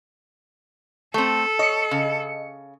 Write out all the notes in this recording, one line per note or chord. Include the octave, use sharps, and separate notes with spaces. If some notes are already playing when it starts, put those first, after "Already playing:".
A3 C4 A4
C#5 D#5 C#7
C#3